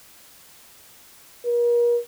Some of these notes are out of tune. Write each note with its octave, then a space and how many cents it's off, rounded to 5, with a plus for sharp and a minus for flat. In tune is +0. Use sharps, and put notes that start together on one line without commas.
A#4 +40